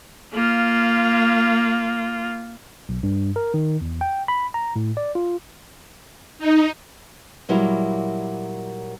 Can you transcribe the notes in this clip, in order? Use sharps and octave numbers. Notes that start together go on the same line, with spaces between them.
A#3 F4
B1
G2
A#4
D#3
E2
G5
B5
A#5
A2
D5
F4
D#4
A#2 F#3 G3 A#3 E4